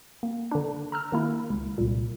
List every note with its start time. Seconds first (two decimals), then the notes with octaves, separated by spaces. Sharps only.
0.23 A#3
0.51 D3 D4
0.92 A#5 E6 F6
1.12 D#3 A#3 E4
1.50 C#2
1.78 C2 A#2